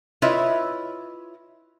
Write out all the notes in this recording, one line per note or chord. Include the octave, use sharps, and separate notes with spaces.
E4 F4 B4 C#5 D#5 E5